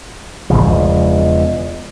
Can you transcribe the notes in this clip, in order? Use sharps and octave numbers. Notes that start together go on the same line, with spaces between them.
E1 D#2 C#3 F3